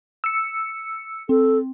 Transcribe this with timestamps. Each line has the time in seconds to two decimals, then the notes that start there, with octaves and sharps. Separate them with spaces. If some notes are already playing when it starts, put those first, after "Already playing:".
0.24 E6 C#7
1.29 C4 A4